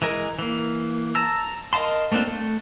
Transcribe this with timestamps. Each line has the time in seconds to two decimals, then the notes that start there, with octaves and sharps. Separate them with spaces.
0.02 E3 G#3 A#4
0.39 E3 A#3
1.15 A5 A#5 E6
1.73 A#4 D#5 F5 A5 C6
2.12 A3 A#3 C4 D4 F4
2.28 A3